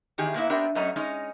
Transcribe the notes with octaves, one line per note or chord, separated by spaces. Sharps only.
E2 D#3 G4 G#4
A#2 A#3 B3 E4
B3 C4 D4 G4 A#4 E5
F#2 A3 C#4 D#5 A#5
G#3 C#4 D#4